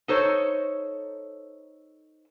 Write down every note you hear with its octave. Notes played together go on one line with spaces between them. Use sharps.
D#4 A4 C5 C#5